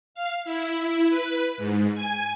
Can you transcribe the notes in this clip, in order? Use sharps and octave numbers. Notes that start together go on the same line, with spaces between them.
F5
E4
B4
G#2
G#5